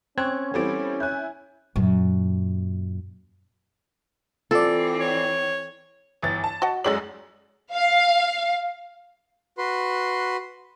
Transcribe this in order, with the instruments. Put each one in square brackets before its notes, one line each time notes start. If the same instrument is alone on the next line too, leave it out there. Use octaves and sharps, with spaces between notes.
[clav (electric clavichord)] C4 [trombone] C#4 [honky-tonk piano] C#6 G#6 [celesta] F#6
[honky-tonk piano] E3 G3 C4 [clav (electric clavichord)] B3 [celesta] A4 D6 D7
[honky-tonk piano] E4 G#5 [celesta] C#5 F#6 G6
[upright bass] F#2 A#2
[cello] E3 C4 [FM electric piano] F4 D5 [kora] A4
[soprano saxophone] C#5
[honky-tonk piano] G1 E3 A6
A5
[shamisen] F#4 D#5 F#5
[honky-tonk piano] F#2 G#3 F#7 [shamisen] A4 C#5 D5
[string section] F5
[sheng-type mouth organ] F#4 B4 C6